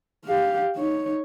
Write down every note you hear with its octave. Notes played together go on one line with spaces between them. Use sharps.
G4 F5
D#4 C#5